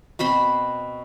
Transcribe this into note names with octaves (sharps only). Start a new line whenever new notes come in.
B2 C4 B5 C6